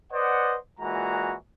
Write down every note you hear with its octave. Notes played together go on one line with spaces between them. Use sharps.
B4 C5 D5 D#5 F#5
A#2 E3 G#3 F#4 A#5